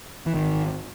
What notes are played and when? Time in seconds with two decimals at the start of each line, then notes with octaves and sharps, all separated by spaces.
0.26 E3
0.34 G#1 D#3